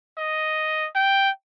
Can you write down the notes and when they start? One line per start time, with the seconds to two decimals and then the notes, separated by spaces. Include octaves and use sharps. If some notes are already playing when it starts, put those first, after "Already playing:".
0.18 D#5
0.95 G5